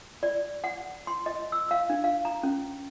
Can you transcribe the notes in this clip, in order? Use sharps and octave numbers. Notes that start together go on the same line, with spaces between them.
D5
F#5
C6
D#5
E6
F5
D4
F5
A#5
C#4